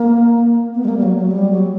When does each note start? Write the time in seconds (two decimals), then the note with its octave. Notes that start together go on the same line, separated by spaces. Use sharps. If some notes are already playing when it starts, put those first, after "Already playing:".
Already playing: A#3
0.75 B3
0.85 G3
0.88 A#3
0.97 G3
1.03 F#3
1.17 F#3
1.31 G3
1.50 F#3